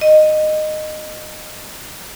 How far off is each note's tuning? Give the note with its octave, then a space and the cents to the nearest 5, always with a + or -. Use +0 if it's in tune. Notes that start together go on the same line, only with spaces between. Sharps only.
D#5 -15